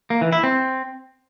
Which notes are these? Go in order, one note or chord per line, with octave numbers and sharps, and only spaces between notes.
A#3
E3
E4
C4